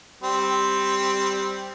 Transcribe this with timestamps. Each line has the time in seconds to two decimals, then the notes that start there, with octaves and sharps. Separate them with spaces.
0.23 G3 C4